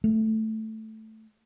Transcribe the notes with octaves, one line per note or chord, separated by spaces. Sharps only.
A3